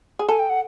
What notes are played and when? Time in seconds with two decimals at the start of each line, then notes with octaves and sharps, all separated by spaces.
0.19 G#4
0.28 A4 G#5
0.39 G5
0.50 F#5